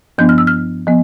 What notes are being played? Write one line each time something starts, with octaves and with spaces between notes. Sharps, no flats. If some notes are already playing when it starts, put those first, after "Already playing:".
G2 F3 B3 D4 G6
F6
E6
F6
F3 B3